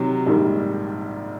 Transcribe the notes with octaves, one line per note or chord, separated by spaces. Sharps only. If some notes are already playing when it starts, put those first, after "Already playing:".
Already playing: C3 D#3 F#3
A#1 G#2 D#3 G3